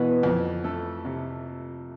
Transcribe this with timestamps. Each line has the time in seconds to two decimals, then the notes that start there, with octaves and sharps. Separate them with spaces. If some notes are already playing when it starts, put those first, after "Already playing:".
Already playing: B2 E3 B3
0.23 F2
0.64 A3
1.05 C3